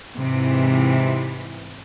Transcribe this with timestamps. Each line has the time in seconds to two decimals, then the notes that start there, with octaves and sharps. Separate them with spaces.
0.19 G#2 C3 E3